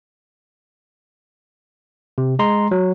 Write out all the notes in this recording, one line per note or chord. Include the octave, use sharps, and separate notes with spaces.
C3
G#3 A#5 C6
F#3